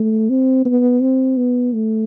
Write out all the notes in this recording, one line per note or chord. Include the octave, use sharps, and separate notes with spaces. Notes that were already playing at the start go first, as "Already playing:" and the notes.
Already playing: A3
C4
B3
C4
B3
A3